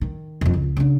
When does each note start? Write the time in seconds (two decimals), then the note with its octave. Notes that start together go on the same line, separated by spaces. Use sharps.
0.01 D#3
0.41 E1 F2
0.54 C#2
0.77 C#3 D4